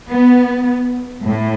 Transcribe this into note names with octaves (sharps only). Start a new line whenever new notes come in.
B3
A2